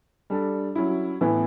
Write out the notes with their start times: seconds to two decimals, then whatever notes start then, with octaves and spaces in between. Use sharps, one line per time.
0.30 G3 D4 A4
0.75 F#3 C#4 E4
1.21 A2 E3 B3 E4